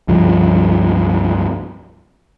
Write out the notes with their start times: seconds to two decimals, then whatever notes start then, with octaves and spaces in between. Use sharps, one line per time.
0.08 C#2 G2 F3